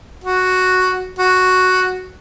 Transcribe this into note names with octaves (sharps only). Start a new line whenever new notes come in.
F#4
F#4